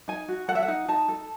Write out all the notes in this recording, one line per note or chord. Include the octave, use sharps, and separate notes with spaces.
D#4 G#5
F#4
A4 F#5
E5
F#5
D#4
D#4 A5
A4